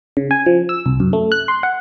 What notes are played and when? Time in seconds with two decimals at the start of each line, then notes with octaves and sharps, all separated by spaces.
0.17 C#3
0.31 G#5
0.46 F3
0.69 E6
0.86 C2
1.00 F#2
1.13 A3
1.32 F#6
1.48 C6
1.63 F#5